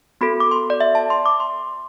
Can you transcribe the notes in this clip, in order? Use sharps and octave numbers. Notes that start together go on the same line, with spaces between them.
B3 F#4 A4 B5
D6
C6
D5
E5
A5
C6
D6
C6